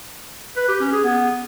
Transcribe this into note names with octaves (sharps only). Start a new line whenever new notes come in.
B4
G4
C#4
G#4
B3